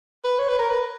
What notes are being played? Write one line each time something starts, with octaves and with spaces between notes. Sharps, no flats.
B4
C#5
B4
A#4
B4